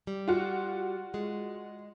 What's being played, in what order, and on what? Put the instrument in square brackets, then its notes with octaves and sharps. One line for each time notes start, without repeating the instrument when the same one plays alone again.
[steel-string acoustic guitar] G3
[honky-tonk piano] F4 F#4
[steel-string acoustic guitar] G#3